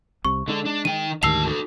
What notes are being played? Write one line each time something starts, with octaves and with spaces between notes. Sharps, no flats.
C2 C3 C#6
D3 G#3 D4
D4
D#3 G5 D#7
D2 G#2 D#3 G4 A5 E6 C7 F7
F#4 A4